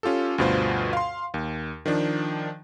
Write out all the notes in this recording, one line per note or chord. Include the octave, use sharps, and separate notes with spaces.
C#4 F4 G4 A4
D2 G2 B2 F4 C5
F5 C6
D#2
D#3 F3 D4